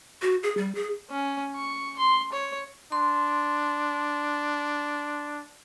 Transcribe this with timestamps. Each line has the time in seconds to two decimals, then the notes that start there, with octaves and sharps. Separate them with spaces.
0.22 F#4
0.43 G#4
0.57 G3
0.75 G#4
1.10 C#4
1.55 C#6
1.98 C6
2.32 C#5
2.92 D4 C6